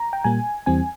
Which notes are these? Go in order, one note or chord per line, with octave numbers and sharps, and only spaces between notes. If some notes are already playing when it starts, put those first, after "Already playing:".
Already playing: A#5
G5
A#2 G3 A#3 G#5
E2 E3 G3 C4 G#5